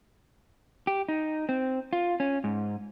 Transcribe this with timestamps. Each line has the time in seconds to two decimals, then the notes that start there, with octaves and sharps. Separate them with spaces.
0.87 G4
1.09 D#4
1.49 C4
1.93 F4
2.20 C#4
2.44 G#2